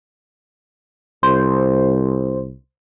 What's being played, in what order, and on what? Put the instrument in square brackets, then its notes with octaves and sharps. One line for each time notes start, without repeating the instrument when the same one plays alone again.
[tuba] C2 [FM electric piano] C5